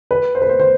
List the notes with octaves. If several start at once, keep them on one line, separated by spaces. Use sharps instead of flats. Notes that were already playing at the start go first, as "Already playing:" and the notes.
B4
C5
B4
C5
C5